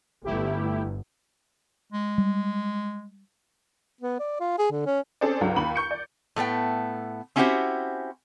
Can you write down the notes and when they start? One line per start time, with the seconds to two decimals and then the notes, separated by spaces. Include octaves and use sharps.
0.24 G1 A3 E4 G4
1.92 G#3
2.18 G3
4.01 B3
4.19 D5
4.40 F4
4.58 G#4
4.71 D3
4.86 C#4
5.21 C4 C#4 G#4 A4 C5 D5
5.41 C#2 G2 F#3
5.56 D#2 B5 F#7
5.76 C#6 G6 C#7
5.91 D5
6.36 A2 A3 B3 G5
7.36 C4 C#4 E4 F#4 G4 C5